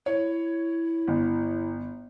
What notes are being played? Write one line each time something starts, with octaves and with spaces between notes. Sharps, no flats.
E4 C#5
G1